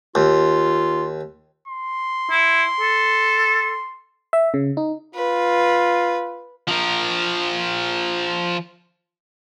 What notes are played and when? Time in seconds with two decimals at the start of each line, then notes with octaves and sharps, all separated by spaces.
0.15 D#2 F4
1.68 C6
2.31 E4
2.80 A4
4.33 E5
4.54 C#3
4.77 D#4
5.15 F4 B4
6.67 F3 A#4